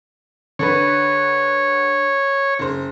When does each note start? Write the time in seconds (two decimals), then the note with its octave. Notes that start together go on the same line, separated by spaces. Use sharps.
0.59 D3 D4 B4 C#5
2.59 F#1 C5